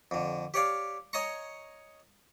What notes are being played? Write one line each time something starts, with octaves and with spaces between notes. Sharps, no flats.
F2 D3
G4 C#5 D5 F5
C#5 D#5 G#5 A#5 C#6